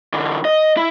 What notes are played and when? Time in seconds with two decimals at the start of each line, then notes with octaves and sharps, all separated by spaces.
0.13 D3 E3
0.45 D#5
0.77 E4